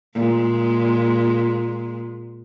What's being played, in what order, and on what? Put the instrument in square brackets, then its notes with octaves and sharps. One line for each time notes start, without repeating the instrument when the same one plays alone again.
[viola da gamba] A#2 G#3